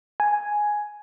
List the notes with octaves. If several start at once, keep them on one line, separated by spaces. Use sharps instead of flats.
G#5